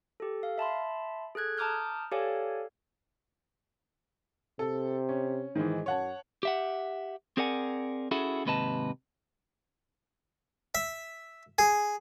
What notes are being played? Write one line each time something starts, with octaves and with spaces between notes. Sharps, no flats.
G4 A4
F5
E5 A5 B5 C6
G#4 A4 F#6 G#6
A5 A#5 D6 D#6 F6 G6
G4 A4 C#5 D5 F5 G#5
C3 A4
C#4
G#2 D#3 E3
F#2 C#5 F#5 A5
G4 E5 F#5
C4 G#4 A#4 D5 F#5 G#5
C#4 E4 F#4 G#4 A4
D#2 G#2 C3 B4 D#5 A5
E5
G#4